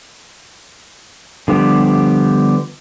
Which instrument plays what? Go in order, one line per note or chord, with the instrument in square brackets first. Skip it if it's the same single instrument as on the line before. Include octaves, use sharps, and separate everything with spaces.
[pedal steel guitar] D3 F3 G3 B3 G4